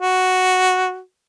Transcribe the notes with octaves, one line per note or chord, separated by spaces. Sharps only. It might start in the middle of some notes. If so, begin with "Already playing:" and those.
F#4